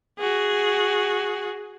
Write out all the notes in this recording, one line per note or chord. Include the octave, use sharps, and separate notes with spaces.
F#4 G#4